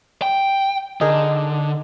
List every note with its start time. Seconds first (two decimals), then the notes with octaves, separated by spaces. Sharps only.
0.22 G5
1.01 D3 D#4 G#4 A#4